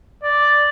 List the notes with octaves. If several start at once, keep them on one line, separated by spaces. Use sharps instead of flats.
D5